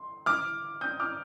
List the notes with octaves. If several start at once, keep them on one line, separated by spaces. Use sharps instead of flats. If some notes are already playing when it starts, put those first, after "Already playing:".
Already playing: C6
D6 F6
D#6 G6
D6 F6